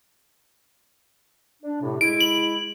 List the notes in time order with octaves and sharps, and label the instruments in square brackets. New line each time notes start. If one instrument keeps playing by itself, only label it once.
[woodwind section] D4
A2 C3
[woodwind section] G#3 E4 [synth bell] D7
[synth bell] F#7